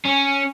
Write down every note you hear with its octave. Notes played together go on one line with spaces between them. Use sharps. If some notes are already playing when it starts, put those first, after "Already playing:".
C#4